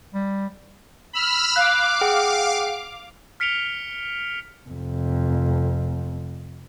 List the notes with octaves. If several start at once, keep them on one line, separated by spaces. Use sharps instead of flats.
G3
B5 E6 F6
F5 D6 F#6
G#4 F#5 G5
F6 B6 C#7 D7 F7 G7
F1 F2